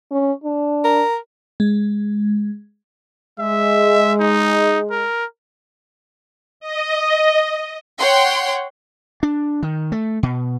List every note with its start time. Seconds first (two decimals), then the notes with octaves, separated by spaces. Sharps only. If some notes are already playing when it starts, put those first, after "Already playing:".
0.12 C#4
0.44 D4
0.84 A#4
1.60 G#3
3.39 G#3 E5
4.20 D#4
4.90 A#4
6.60 D#5
7.98 C#5 F#5 G5 C6
9.23 D4
9.63 D#3
9.92 A3
10.23 B2